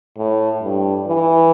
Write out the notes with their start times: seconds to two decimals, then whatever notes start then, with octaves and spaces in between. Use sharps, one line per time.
0.18 A2
0.62 G2
1.07 E3